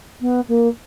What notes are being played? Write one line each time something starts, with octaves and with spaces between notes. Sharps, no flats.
B3
A#3